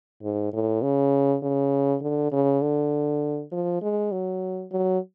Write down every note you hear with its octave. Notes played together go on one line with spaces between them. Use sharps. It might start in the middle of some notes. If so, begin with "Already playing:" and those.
G#2
A2
C#3
C#3
D3
C#3
D3
F3
G#3
F#3
F#3